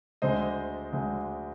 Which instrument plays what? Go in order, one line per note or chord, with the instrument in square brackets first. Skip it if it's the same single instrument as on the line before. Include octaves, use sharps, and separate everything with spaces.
[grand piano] D2 D3 G#3 C5 D#5
D2 D3 G#3